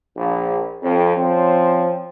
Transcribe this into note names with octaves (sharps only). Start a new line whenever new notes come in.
A#1
F2 C4
F3 C4 C#4 C5